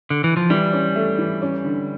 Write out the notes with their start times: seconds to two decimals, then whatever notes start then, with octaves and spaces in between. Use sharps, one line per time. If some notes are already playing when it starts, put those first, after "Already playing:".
0.10 D3
0.24 E3
0.37 F3
0.50 E3 G3
0.73 C#4
0.95 A3
1.19 E3
1.42 C#4
1.64 D3